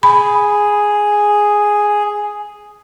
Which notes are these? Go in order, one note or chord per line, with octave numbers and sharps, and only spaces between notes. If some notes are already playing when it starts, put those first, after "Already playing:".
G#4 B5